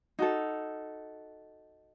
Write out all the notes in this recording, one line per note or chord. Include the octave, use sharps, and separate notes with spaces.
D#4 F#4 A4